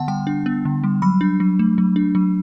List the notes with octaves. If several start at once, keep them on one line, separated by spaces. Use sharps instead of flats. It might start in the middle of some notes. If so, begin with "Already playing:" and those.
Already playing: D3 B3 F#5 A5
G3 G5
D4
B3
D3
G3
F#3 B5
D4
F#3
A3
F#3
D4
F#3